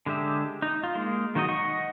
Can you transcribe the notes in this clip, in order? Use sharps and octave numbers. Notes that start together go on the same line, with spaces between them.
D3 G#3 G4 E5
D#4
F4
G#3 A#3
D#3 F#3 D#4 F#4 D#5
D#5 F#5 C#6